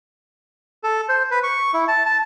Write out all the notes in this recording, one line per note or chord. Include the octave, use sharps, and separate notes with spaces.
A4
C5
B4
C#6
E4
A5
A5